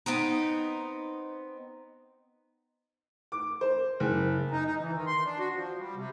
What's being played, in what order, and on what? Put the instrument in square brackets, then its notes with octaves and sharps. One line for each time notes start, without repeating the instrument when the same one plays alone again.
[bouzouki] B3 C4 D#4
[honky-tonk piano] D6
C5
F#1
[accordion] D#4
D#4
E3
D#3
C6
D4
F#4
F3
G3
C3